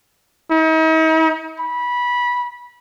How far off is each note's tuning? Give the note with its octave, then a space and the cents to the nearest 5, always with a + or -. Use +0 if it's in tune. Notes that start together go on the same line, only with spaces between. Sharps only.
D#4 +45
B5 -20